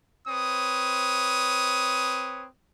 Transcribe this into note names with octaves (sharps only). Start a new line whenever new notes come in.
C4 B4 C#5 D#6